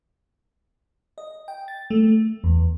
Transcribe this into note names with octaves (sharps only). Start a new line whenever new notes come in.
D#5
G5
A6
A3
E2